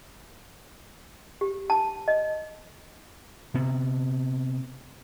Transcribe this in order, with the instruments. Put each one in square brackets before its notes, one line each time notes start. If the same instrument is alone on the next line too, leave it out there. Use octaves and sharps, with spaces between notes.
[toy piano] G4
A5
D#5
[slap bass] C3 B3